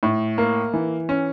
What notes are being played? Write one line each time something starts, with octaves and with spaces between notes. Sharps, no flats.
A2
A#3
E3
C#4